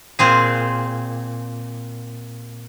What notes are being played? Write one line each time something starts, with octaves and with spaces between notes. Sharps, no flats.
A#2 C4 G#4